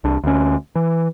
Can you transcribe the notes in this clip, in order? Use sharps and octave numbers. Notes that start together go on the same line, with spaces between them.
C2 D4
D2 C#4
E3